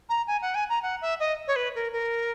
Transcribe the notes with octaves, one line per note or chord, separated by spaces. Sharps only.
A#5
G#5
F#5
G#5
A#5
F#5
E5
D#5
C#5
B4
A#4
A#4